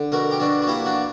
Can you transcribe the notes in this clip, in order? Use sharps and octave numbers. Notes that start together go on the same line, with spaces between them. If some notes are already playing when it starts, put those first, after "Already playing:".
Already playing: D3
B2 F#4 A#4
G4
B2 D4 F#4
F#4
A#3 E4 G4
D4 F#4